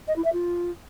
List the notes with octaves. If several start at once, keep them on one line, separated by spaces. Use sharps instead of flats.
D#5
E4
E5
F4